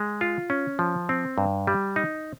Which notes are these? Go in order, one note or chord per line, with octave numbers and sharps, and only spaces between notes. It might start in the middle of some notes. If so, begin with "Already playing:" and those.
Already playing: G#3
F4
C#4
F3
C4
G2
G3
D#4